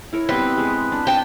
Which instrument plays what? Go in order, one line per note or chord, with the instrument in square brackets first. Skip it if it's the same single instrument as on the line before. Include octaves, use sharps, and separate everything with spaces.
[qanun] E4 A#4 C#5
[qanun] G3 B3 C4 [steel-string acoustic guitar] B4
[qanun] G#3
D4
[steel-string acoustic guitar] G5 A5